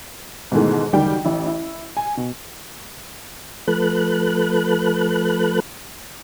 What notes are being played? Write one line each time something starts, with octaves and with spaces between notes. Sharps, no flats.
G#2 B2 D#3 E3 G#3 A3
F#1 D2 D#3 G3 G4 G5
A1 E4
E4
G#5
B2
F3 A3 A4 B4 F#6